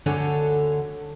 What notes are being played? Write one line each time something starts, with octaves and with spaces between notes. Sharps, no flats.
D2 D3 D4 A4 C#5 G#5